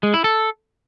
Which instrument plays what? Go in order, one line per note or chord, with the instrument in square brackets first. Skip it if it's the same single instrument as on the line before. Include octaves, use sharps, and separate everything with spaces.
[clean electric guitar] G#3
E4
A4